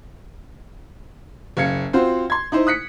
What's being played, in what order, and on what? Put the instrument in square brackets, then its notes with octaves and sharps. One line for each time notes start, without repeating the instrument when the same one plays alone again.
[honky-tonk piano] F#1 F5 G#6 C#7
C4 F4 F#4 C5
C6 G#6
D#4 E4 C5
D#6 F#6 B6 C#7